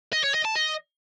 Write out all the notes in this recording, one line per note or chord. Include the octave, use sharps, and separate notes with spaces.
D#5
C#5
D#5
A5
D#5